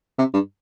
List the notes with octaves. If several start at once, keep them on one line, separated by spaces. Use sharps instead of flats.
C3
G2